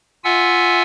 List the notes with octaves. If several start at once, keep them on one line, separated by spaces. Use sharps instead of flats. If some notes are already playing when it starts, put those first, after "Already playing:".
F4 E5 F#5 G#5 E6